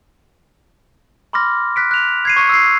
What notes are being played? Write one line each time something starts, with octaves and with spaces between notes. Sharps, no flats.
B5 C6 D6 F6 A#6
F#6 B6 D7
F#6 F7
G#6 C7 D#7
C#6 D#6 C#7 D#7
E6 C7